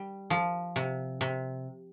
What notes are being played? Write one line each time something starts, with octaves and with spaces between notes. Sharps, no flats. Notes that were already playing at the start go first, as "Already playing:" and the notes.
Already playing: G3
F3
C3
C3